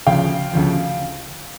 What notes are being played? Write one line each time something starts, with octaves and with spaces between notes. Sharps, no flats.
D2 C#3 F3 F5 G5
D2 C#3 F3